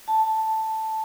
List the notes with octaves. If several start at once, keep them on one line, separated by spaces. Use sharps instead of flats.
A5